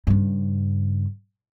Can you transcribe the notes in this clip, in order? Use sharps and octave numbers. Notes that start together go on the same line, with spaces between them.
G2 C#3